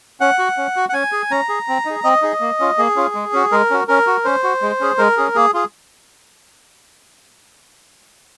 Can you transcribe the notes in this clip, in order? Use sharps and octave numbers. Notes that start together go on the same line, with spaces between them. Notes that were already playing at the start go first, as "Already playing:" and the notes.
C#4 F#5
F#4
C#4
F#4
F#5
C#4 G#5
G#4
C#4 A#5
G#4
C4
D#4 G#4
C4 D#5
D#4 G#4
A#3
C#4 F4
A#3 G#4
C#4 F4
G#3
C#4 F#4
G#3 A#4
C#4 F#4
C#4 A#4
F#4
C#4 C5
F#4
G#3
C#4 G#4
G#3 A#4
C#4 G#4
A#3 G#4
F4 G#4